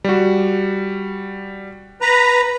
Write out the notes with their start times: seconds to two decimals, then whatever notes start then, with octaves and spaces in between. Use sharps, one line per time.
0.04 G3 F#4
2.01 B4 A#5